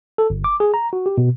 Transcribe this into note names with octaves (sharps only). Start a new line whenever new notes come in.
A4
G1
D6
G#4
A#5
F#4
G4
B2